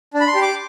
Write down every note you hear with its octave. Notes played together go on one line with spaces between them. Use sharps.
D4
B5
C6
G4
D6